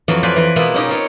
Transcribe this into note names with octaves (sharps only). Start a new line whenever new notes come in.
F2 E3 F#3 F5
B4 C5 D5 F5 G5 G#5
E3 B4
B2 G#3 A#3 B3 E4 F4
C#4 D#4 G4
C4 F4 C#5